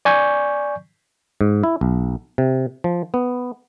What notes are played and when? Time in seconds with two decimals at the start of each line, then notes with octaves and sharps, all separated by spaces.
0.05 D5 G#5 C#6 G6
1.41 G#2
1.63 E4
1.81 B1
2.38 C3
2.84 F3
3.14 B3